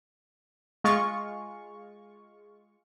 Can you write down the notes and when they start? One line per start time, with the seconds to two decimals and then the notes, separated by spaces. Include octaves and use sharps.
0.84 G#3 F4 C#6